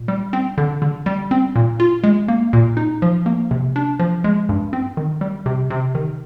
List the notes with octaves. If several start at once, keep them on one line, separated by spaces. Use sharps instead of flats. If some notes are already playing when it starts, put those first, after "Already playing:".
Already playing: A#2
G3
C4
D3
D3
G3
C4
A#2
F4
G#3
A#3
A#2
D#4
F3
A#3
C3
D4
F3
G#3
G2
C4
D#3
G3
C3
C3
D#3